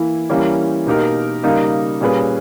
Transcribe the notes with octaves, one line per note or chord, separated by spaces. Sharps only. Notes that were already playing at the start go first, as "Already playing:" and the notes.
Already playing: E3 A#3 E4
E3 G3 A#3 C#4 G4
B2 A#3 D#4 G4 A#4
C#3 G3 A#3 D#4 A#4
A#2 G3 C#4 G#4 B4